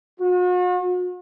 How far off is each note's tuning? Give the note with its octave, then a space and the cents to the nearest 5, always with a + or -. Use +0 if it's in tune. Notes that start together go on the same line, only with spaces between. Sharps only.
F#4 -45